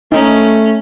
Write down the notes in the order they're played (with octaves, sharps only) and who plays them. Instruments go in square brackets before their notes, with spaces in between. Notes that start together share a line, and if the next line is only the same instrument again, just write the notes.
[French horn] A3 [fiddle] C#4 [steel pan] D#4